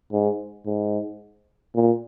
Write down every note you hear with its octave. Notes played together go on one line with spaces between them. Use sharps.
G#2
G#2
A#2